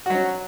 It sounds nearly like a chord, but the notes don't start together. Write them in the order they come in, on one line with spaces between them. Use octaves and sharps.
F#4 F#3 C#4